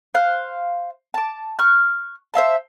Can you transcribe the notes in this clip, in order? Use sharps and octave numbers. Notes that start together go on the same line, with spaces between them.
C5 F5 F#6
A5 D6
C#6 F6 F#6
C5 E5 F5 A5